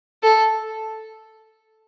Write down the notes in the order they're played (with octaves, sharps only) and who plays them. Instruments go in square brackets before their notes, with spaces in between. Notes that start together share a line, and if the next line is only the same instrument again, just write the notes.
[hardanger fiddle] A4